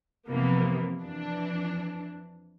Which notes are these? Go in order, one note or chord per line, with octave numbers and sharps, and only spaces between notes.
F2 C3 E3 A#3 B3
F2 E3 D4